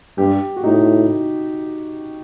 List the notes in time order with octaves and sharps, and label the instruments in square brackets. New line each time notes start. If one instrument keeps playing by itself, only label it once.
[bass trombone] G2 [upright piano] G4
[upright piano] F#4
[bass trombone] A2 [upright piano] D#4